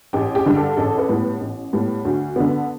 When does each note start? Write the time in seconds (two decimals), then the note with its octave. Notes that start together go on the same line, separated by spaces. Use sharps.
0.13 A1 G4
0.35 G4
0.46 G2 D3
0.56 A4
0.77 A1 A4
0.98 B4
1.09 A2 G3 B3
1.41 A1
1.73 A2 G3 B3
2.05 D2
2.36 D3 B3